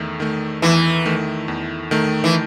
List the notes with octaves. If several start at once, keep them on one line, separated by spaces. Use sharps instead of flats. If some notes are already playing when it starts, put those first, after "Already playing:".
Already playing: E2 D#3 A3
D#3 A3
E2 E3
D#3 A3
E2
D#3 A3
E3